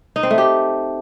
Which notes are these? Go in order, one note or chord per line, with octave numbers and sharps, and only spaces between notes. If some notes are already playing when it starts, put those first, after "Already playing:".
D#4
C4
A3
G4